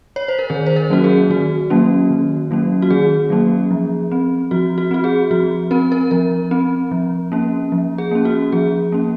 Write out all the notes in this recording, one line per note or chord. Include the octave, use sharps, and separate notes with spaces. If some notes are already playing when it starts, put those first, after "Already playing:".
C#5
C5
A#4
D#3 G#4
C5
A#4
F#3 A#3 C#4 F#4
G#4
D#3 F#4
F#3 A#3 C#4
D#3
F#3 A#3 C#4
F#4
D#3 G#4
F#3 A#3 C#4
F3
C4
F3 F#4
F#4
C4 F#4
G#4
F3 F#4
C4 A#4
A#4
F3 A#4
C4
F3
A#3 C#4
F3
G#4
A#3 C#4
F#4
F3 G#4
A#3 C#4